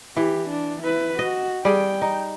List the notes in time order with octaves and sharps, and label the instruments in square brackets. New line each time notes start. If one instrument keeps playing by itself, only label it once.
[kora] E3 [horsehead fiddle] G4
[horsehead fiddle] D4
E4 B4
[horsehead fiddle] F#4 [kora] D#5
[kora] G3 G#4 [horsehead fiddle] G5
[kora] D#4